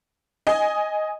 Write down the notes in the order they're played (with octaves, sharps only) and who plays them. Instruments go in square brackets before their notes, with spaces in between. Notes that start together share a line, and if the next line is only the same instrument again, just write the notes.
[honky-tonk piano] D#5 G#5